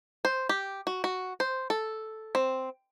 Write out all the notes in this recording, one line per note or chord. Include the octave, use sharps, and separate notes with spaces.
C5
G4
F#4
F#4
C5
A4
C4